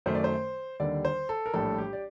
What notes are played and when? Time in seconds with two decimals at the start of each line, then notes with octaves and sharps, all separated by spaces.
0.06 F#2 D#3 A3 C5
0.15 D5
0.24 C5
0.80 D#2 D3 G3 D5
1.05 C5
1.29 A4
1.46 A#4
1.54 A#1 A2 G3 A4
1.78 G4
1.93 D5